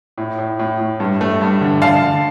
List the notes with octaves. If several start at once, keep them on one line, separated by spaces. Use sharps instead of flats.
A2
A2
A2
A2
G2
A3
G2
D3
D3 F5 A5
D3